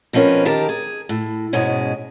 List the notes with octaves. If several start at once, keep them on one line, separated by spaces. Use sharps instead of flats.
B2 F3 C4 C#4 A#4 B4
D#3 G4 A#4 A5
G#4
A2
G#2 B2 G#3 C#4